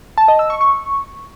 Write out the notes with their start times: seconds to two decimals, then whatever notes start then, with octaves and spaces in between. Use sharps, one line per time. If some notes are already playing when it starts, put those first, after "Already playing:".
0.18 A5
0.28 D#5
0.39 E6
0.50 C#6
0.61 C#6